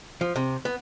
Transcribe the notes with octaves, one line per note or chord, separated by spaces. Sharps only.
F3
C3
B3